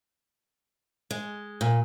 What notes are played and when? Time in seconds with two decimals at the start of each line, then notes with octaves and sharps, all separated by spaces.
1.11 G#3
1.61 A#2